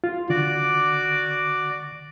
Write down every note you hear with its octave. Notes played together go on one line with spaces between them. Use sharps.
F4
D3 F#4 D5 D6